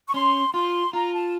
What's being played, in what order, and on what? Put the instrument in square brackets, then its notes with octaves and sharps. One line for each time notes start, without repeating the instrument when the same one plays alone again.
[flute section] C#6
[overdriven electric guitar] C#4 [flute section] C6
[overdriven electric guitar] F4 [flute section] C6
[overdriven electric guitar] F4 [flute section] A#5
[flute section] A5